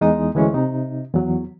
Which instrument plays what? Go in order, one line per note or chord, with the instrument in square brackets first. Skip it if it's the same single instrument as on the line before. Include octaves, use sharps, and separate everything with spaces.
[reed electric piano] E2 G#3 D#4 D#6
D2 E3 G#3 C#4
C3 D#4
E2 F#3